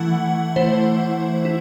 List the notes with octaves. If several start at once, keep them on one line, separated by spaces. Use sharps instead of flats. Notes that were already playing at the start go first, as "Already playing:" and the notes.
Already playing: E3 A3 E4 F#5
E3 A3 E4 C5
E4